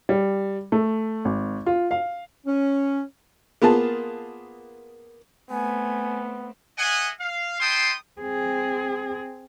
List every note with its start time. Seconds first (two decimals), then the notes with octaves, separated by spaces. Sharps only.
0.09 G3
0.72 A3
1.25 G#1
1.66 F4
1.91 F5
2.46 C#4
3.62 A#3 B3 F4 G#4 A5
5.50 A3 B3 C4 G#5
6.78 G#4 D#5 E5 F#5 G#5
7.20 F5
7.60 E4 C5 G5 A5 C6 D#6
8.21 C4 G#4